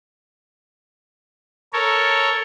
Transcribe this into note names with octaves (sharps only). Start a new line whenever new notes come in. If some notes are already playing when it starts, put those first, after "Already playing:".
A4 A#4 C#5